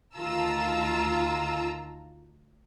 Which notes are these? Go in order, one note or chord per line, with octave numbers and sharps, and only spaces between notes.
D2 D#3 F4 A5 A#5 E6